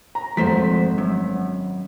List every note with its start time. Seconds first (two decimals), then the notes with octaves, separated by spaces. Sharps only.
0.15 A#5
0.37 G#1 F3 A3 C5 B6
0.98 F#2